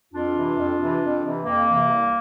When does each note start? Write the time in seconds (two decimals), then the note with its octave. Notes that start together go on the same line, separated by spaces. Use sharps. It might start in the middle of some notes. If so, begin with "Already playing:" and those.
0.13 F2 D4 F4
0.35 C3 E3
0.57 F2
0.78 C3 E3
1.01 F2
1.24 C3 E3
1.45 F2 A#3
1.67 C3 E3
1.90 C2